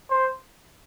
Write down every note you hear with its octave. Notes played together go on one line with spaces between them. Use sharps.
C5